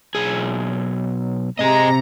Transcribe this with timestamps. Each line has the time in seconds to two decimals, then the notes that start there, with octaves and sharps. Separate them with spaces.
0.15 B1 G#4
1.59 C3 G#4 D#5 A#5